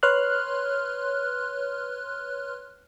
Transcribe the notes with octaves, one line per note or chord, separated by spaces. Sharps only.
B4 C#5 C6 F6 F#6